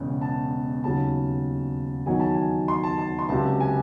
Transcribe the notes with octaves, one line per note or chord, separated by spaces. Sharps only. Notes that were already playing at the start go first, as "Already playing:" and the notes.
Already playing: E1 E2 C#3
A5
D#2 C#3 F#3 A5
E2 D#3 F#3 G#5
A5
G#5
C6
A5
A5
C6
C#2 C3 F#3 A5
G#5